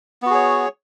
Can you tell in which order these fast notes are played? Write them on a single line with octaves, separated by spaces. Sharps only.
B3 F#4 G#4 C#5